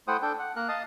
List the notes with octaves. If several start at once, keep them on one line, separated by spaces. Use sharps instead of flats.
A3 E4 C5 F#5 G5 D#6
D4 A4 G5
F#5
A#3 A#4 F#6
D#5 F5 A5 D#6